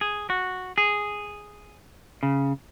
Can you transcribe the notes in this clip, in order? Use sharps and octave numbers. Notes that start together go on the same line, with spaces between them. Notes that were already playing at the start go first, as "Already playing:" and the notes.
G#4
F#4
G#4
C#3